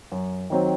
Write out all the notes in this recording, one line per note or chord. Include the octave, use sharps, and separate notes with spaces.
F#2
D#3 F#3 C4